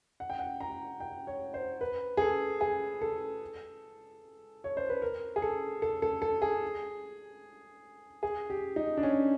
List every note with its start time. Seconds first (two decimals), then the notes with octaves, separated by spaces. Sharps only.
0.20 F#5
0.30 G5
0.39 F#5
0.60 A#5
1.00 G5
1.27 C#5
1.54 C5
1.81 B4
2.17 G#4
2.22 A4
2.61 G#4
3.01 A4
4.64 C#5
4.77 C5
4.90 B4
5.02 A#4
5.36 G#4
5.42 A4
5.82 A4
6.02 A4
6.22 A4
6.42 G#4
8.23 G#4
8.50 G4
8.76 D#4
8.97 D4
9.03 C#4